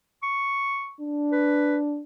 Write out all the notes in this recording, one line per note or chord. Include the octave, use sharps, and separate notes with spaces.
C#6
D4
B4